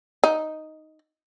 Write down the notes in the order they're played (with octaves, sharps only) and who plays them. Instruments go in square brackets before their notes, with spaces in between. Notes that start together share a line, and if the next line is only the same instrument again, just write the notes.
[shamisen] D#4